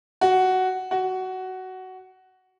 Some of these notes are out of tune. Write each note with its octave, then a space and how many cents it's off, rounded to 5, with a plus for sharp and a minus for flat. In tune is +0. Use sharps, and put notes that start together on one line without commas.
F#4 +10
F#4 +15